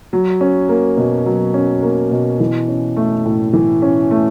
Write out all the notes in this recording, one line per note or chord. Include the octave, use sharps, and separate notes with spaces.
F#3
C#4
A#3
B2
F#3
C#4
A#3
B2
E3
C#4
A3
A2
E3
C#4
A3